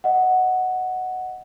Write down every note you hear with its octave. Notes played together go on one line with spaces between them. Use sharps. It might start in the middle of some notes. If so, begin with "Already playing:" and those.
D#5 F#5